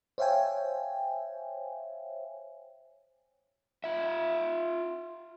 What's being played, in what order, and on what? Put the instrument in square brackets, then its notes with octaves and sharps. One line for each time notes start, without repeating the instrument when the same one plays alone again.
[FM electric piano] C5 C#5 E5 F5 G5 G#5
[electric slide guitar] F4 E5